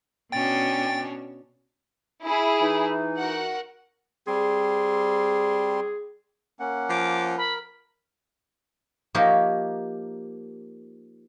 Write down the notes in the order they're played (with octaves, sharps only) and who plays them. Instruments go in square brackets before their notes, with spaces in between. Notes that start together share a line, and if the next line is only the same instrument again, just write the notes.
[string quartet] B2 C#4 D4 [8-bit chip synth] G5 A6
[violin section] E4 G#4
[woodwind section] E3 D#4
[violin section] F#4 A#4 F#5
[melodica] G3 C4 C6 [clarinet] G#4
[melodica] A#3 C#4 F#5
[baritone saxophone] F3 [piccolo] D6
[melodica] A#4 [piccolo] B5
[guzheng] F3 A#3 D#4 G4 A#4 C#5